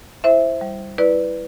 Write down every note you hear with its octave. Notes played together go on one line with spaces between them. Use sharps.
E4 C5 E5
G3
E4 B4 D5